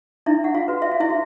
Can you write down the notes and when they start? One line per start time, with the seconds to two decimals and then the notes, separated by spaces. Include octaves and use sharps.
0.26 D4 E4 E5
0.44 F#5
0.54 F4 F5
0.68 F#4 B4
0.82 E5
0.91 F5
1.00 E4 E5
1.10 F#4